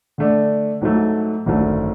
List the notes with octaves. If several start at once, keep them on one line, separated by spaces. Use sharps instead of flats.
D3 A3 D4
G#2 F#3 A3
G#1 F#2 D3 F#3 A3